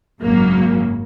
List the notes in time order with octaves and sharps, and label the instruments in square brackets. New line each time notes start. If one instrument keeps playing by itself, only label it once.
[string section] G#1 F#2 C#3 F#3 A#3